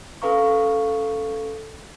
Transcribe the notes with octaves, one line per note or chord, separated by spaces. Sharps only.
C#4 A4 B4 F5 A#5 C#6